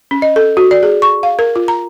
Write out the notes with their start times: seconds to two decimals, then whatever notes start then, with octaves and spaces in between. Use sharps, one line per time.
0.11 C#4
0.22 D#5
0.36 A4
0.57 F#4
0.71 D5
0.83 G#4
1.02 C#6
1.23 F5
1.39 A#4
1.56 F4
1.68 A#5